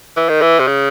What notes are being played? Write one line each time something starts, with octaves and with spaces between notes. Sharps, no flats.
E3
D#3
E3
C3
C#3